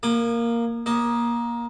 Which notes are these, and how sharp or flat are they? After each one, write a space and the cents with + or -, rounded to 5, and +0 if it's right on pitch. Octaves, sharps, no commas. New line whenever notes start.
A#3 +0 G#5 +0 D#6 -40
A#3 +20 D#5 +0